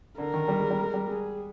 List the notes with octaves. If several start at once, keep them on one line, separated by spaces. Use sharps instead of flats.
D3 A#4
D#3
G3
G#3
G3
G#3
G3
G#3 G#4